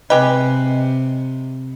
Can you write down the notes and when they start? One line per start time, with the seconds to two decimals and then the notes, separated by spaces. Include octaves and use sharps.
0.10 C3 G#3 G4 B4 D#5